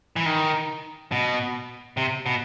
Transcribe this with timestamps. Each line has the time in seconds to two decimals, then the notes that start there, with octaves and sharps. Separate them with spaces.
0.16 E3
0.26 D#3
1.12 B2
1.97 C3
2.26 B2